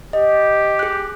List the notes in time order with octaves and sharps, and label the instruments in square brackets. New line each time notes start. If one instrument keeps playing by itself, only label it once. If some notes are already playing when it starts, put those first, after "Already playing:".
[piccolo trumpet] G4 [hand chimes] D#5
[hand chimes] G#4 F#6